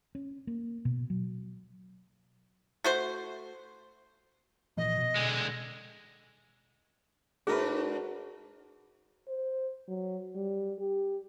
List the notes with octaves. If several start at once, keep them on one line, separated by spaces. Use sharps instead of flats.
C#4
A#3
B2
F#3
A3 F#4 C5
A#2 E3 F3 D#5
B2
D3 G#3
G#2 D4 F#4 G#4 A#4 B4
C5
F#3
G3
G4